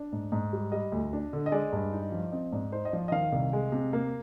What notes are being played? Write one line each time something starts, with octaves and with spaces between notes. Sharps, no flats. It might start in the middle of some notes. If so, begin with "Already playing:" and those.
Already playing: D4
G#2
G#2
G3
G3 D#5
D2
D4
D3
D#5
G#3 D5
G2
D#4
F3
C4 D#5
G#2 D5
D#4 C5
D#5
F3 D5
D#5
D#3 F5
C2
G#3
C3
A#3